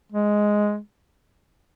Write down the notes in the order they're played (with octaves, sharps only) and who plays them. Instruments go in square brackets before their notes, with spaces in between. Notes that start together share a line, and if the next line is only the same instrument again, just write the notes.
[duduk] G#3